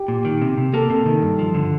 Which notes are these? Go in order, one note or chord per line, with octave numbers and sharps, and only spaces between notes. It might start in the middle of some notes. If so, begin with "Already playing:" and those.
Already playing: G4
A#2
D#3
C3
C3
A#3 A4
C3
D#3
G2
F3
D3